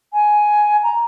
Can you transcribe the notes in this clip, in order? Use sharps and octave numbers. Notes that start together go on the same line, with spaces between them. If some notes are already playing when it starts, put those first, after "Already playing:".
G#5
A#5